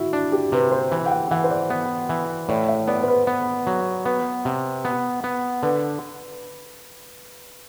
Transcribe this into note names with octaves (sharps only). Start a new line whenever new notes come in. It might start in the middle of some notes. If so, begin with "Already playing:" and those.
Already playing: E4 F#4
D4
G4
C3 B4
C5
E3
G5
F#5
E3 F#5
C5
D5
B3
E3
A2 D5
E5
B3 D5
C5
B4
B3
F#3
B3 B4
C3
B3
B3
D3 B4